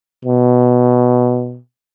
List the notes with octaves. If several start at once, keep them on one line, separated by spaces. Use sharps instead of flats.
B2